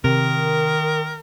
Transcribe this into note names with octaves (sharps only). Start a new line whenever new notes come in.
C3 D#3 A#4